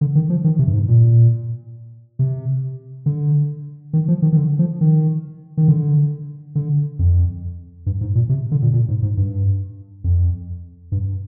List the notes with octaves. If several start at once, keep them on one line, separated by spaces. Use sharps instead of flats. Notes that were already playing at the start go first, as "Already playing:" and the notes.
D3
D#3
F3
D#3
C3
G2
G#2
A#2
C3
D3
D#3
F3
D#3
D#3
D3
F3
D#3
D#3
D3
D3
F2
G2
G#2
A#2
C3
D3
A#2
A#2
G#2
G#2
G2
F2
G2